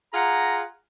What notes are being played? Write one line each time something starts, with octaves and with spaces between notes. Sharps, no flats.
F4 G#4 F#5 A#5